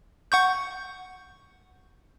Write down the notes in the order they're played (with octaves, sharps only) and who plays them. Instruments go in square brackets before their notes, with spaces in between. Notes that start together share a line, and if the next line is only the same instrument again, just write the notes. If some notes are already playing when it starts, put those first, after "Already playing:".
[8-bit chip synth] F#5 C#6 G6